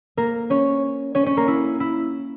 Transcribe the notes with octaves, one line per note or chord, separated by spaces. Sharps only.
A#3 A#4
C#4 C#5
C#4 C#5
C#4 C#5
A#3 A#4
E4
E4